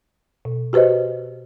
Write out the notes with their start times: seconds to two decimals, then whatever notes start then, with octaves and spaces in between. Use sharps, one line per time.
0.45 B2
0.73 F#4 G4 B4 C5 D#5